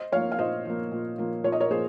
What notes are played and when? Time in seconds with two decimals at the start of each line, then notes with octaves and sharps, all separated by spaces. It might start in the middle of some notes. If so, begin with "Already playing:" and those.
Already playing: C5 D#5
0.12 F3 A#3 C#5 F5
0.32 F5
0.39 A#2 C5 D#5
0.65 F3 A#3
0.91 A#2
1.18 F3 A#3
1.44 A#2 C#5
1.52 D#5
1.60 A#4 C#5
1.70 F3 A#3 G#4 C5